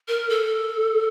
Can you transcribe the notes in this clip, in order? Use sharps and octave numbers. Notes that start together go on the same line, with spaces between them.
A#4
A4